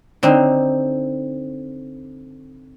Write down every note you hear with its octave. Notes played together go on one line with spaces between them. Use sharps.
D3 C4 D#4